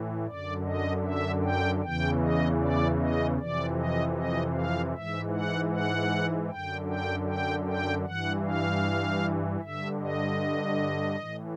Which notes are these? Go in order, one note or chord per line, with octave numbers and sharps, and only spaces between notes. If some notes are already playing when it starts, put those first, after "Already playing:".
Already playing: A2 E3
F#2 D3 D5
D#5
E5
G5
E2 C#3 E3 G5
D#5
D5
D#5
F2 C3 E3 D5
D#5
D#5
F5
G#2 E3 E5
F#5
F#5
F#2 D3 G5
G5
G5
G5
G2 E3 F#5
F5
G2 D3 E5
D#5
A2 E3